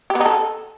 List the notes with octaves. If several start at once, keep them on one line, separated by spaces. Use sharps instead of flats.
G4
B3
D#4
A4